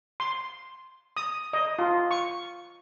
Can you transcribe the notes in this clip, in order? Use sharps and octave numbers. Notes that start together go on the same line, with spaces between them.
C6
D#6
D#5
F4
C#6